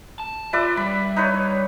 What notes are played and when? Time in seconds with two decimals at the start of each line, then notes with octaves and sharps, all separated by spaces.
0.20 A5
0.53 F4 B4 D5 E5
0.77 G3 D4 B5
1.16 D#4 B4 C#5
1.34 C#5